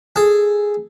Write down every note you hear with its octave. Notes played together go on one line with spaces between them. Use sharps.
G#4 A4